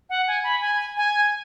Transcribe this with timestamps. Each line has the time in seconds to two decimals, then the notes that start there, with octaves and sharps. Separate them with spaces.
0.10 F#5
0.27 G#5
0.44 B5
0.61 G#5
0.97 G#5